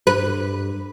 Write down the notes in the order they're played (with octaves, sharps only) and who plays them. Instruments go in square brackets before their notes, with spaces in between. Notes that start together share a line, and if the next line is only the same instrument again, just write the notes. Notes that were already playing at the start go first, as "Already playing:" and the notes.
[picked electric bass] G2 [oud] B4